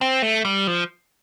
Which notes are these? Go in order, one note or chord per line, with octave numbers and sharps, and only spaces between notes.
C4
A3
G3
F3